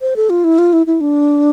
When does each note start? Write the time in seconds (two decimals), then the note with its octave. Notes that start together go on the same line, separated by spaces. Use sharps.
0.01 C5
0.16 A4
0.30 F4
0.44 E4
0.58 F4
0.73 E4
0.87 E4
1.01 D4